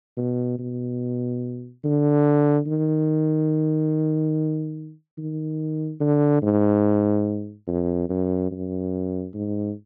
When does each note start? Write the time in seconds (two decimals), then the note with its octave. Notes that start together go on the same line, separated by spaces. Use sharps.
0.17 B2
0.59 B2
1.84 D3
2.67 D#3
5.18 D#3
6.00 D3
6.42 G#2
7.67 F2
8.09 F#2
8.51 F#2
9.34 G#2